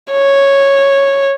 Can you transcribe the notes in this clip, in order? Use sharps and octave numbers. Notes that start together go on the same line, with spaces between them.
C#5